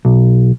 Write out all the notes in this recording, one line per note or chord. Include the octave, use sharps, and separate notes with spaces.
B1